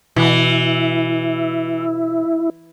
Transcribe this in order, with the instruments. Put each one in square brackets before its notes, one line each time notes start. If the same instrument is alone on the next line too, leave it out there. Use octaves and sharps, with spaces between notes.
[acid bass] B2 [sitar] E3 [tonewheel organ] E4